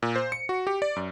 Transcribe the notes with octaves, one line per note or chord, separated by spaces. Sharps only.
A#2
C5
C#7
F#4
G4
D5
F#2